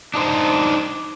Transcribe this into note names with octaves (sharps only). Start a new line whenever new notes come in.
D4 D#4 C5